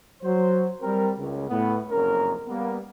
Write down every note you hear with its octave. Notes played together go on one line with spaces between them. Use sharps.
F#3 C5
G3 C4 A#4
C#2
A2 B3
F#1 F2 C#4 A#4
G3 A#3 B3